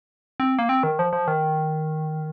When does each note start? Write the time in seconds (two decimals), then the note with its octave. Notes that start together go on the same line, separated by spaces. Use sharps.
0.40 C4
0.59 A#3
0.69 C4
0.83 D#3
0.99 F3
1.13 F3
1.28 D#3